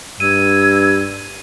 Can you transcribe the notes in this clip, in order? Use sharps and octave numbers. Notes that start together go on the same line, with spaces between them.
G2 E6 G#6 D#7